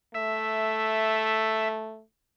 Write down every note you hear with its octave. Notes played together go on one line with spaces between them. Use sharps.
A3 E5